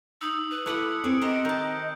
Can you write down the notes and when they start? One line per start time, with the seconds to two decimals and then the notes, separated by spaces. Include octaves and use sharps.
0.21 D#4 D#6 E6
0.51 B4
0.66 A3 E4 B4 F#5 D6 F#6 C#7
1.04 C4 G#4 A4 D5 C#7 D7
1.21 G4 A#4 C5 D#5
1.45 D#3 A5 G6 D7